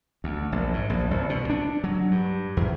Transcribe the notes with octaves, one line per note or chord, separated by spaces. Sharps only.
D2
A#1
G#2
A#1
C2
B2
D4
F#3
G2
E2